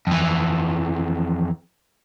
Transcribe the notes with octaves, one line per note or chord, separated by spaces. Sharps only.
F2 E3